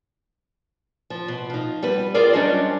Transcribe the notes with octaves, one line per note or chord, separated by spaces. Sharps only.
F3
B2
F3 D#4
G3 B3 B4
C4 F4 G#4 A#4 D5
F#3 G3 C#4 D4 C5 D#5